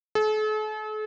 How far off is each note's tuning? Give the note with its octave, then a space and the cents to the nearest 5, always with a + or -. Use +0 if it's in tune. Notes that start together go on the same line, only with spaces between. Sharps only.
A4 -45